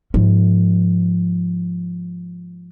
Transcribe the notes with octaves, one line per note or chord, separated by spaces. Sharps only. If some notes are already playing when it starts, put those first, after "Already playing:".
G#2 F3